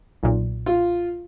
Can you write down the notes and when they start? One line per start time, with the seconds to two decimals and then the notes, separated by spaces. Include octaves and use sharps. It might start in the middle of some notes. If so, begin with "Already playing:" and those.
0.23 B1 A#2
0.66 F4